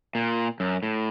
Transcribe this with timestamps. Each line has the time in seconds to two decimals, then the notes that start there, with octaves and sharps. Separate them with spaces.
0.15 A#2
0.60 F#2
0.83 A2